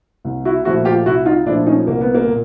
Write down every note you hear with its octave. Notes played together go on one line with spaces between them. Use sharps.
C2
E4 F#4
A#2 F3 A3 E4 F#4
F4 G4
C2 E4 F#4
D#4 F4
A#2 F3 A3 D4 E4
C#4 D#4
C2 A#3
B3
A#3
A#2